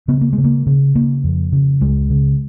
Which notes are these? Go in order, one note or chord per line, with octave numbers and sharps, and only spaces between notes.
C#3 B3
A#3
G#3
C#3
A#3
C#3
C#3 A#3
F2
C#3
C#2 G#3
C#3